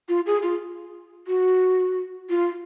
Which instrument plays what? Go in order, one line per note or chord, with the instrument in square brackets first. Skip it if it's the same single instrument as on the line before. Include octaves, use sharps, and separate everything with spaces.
[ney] F4
G#4
F4
F#4
F4